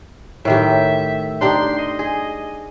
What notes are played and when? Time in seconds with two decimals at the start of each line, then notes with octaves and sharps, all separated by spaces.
0.45 A2 D#3 G4 E5
1.41 D4 D#4 G4 C6
1.79 D#5
1.99 G#4